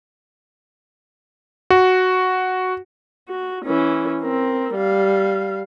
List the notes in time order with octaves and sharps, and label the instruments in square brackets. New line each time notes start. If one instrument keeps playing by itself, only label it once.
[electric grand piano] F#4
[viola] F#4
E3 C#4
C4 A#4
G3 F5